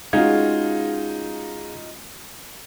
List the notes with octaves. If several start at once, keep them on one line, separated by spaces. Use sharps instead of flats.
G#3 C#4 D#4 F4 F#4 G#4 F5 G#6